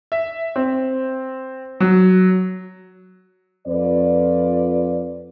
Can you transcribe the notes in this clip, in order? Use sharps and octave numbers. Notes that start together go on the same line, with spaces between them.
E5
C4
F#3
F2 F4 B4 D5